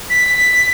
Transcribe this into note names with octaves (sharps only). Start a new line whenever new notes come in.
B6